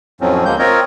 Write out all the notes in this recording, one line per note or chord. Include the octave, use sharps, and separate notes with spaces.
F2 A2 F3 F#3 C4 C#4
D2 G#3 A#3 G6
C4 F4 A#4 C#5 D#5